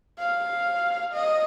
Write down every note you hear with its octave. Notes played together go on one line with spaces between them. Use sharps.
F5
D#5